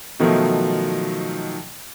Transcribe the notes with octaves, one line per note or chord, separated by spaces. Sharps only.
B2 D#3 F3 F#3 A3